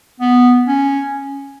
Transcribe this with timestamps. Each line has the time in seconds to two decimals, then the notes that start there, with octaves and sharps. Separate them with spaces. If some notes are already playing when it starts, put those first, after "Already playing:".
0.20 B3
0.67 C#4